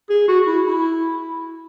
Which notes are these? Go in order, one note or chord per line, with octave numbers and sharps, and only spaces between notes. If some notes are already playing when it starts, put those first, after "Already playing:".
G#4
F#4
E4
E4